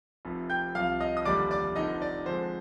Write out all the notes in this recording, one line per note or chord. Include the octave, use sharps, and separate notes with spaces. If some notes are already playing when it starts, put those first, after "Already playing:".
F1 F2 C3
G5 G6
C2 C3 F3 F5 F6
D#5 D#6
D#6
F1 D#2 D3 G3 D5 D6
D5 D6
F1 F2 D3 D#4 D#5
D5
F2 D3 G#3 C5